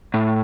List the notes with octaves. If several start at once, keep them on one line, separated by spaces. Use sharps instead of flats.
A2